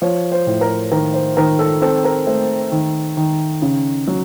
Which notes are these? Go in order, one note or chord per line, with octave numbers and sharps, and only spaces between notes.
F3 C#5
C5
A2
A#4
D#3 A#4
C5
D#3 A#4
A4
C4 A4
A#4
A3 C5
D#3
D#3
C#3
F#3